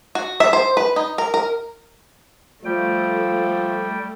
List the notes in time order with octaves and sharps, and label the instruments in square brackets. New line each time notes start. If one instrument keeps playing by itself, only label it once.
[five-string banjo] F#4
E5
C5
B4
D#4
A#4
A#4
[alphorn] F3 [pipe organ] G3 G5 [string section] A3